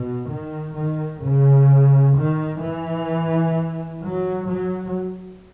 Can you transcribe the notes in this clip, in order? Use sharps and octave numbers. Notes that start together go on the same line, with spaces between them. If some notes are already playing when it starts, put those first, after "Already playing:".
Already playing: B2
D#3
D#3
C#3
D#3
E3
F#3
F#3